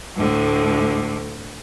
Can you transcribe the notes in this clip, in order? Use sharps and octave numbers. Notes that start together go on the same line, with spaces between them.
D2 A2 D3